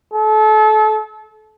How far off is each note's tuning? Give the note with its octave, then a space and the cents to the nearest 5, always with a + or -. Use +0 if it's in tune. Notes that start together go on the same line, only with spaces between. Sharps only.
A4 -30